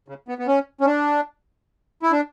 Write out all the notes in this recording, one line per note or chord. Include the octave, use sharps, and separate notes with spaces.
C#3
B3
B3
C#4
C#4
D4
E4
D4